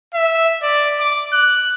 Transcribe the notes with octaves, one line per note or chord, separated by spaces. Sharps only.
E5
D5
D6
F#6